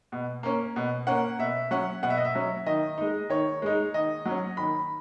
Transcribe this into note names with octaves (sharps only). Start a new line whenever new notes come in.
B2
A#3 C#4
B2
A#3 C#4 F#5
B2 E5
F#3 C#4 F#5
B2 F#5
E5
D#5
E5
F#3 C#4
D#3 D#5
G#3 D#4
D#3 C#5
G#3 D#4
D#3 D#5
F#3 C#4
D#3 B5